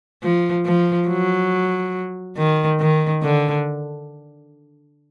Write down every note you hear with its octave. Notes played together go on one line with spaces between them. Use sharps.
F3
F3
F#3
D#3
D#3
D3